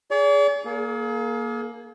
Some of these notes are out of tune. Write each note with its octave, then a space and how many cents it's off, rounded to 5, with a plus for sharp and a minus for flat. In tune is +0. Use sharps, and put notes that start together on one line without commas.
G#4 +0 D5 -45
A#3 +10 G#4 +40